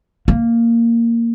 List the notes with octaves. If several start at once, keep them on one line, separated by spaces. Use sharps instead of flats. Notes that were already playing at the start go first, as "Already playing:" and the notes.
A#3